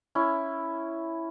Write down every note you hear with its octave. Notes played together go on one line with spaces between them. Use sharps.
C#4 E4